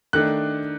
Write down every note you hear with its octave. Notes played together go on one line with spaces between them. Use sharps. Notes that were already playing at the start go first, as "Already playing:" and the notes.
D#3 A3 D4 F#6